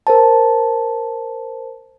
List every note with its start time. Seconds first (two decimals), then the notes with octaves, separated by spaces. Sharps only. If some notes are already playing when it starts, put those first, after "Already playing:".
0.07 A#4 C5 A5